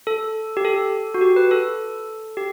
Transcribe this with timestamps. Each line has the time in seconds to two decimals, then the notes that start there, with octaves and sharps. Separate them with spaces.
0.07 A4
0.57 G4
0.65 A4
1.14 F#4
1.21 G4
1.36 B4
1.51 A4
2.37 G4